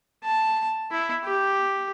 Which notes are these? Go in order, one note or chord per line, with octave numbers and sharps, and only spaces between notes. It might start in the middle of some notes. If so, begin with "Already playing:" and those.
A5
E4
G4